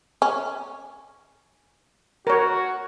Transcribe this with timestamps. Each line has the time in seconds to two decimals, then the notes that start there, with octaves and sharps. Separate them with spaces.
0.22 C#4
2.27 F#4 A#4 C#5